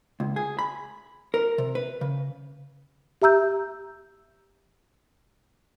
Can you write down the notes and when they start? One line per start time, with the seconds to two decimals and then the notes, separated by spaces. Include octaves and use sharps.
0.20 C#2
0.36 G#4
0.59 B5
1.34 A#4
1.58 C3
1.75 B4
2.01 C#3
3.22 G4 E5 A#5 E6 G6